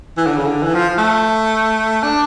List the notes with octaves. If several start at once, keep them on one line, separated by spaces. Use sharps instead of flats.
E3
D3
C#3
D3
E3
F3
A3
D4